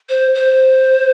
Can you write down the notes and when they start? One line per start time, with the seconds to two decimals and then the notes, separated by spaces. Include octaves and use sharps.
0.09 C5
0.35 C5